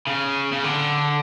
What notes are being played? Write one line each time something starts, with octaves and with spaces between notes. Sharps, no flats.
C#3
C#3
D3